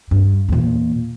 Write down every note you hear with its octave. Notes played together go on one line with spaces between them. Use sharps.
G2
E2 A#2